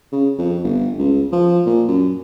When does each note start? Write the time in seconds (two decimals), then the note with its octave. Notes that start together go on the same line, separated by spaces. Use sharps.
0.12 C#3
0.39 F2
0.64 G1
0.98 C#2
1.32 F3
1.66 A#2
1.88 F#2